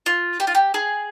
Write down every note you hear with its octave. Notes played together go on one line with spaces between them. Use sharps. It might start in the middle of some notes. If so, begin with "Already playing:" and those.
F4
G4
F4
G4
G#4